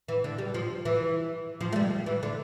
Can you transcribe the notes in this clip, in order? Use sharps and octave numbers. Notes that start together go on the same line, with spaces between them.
E3
D3
G3
F3
E3
F3
A3
G3
E3
D3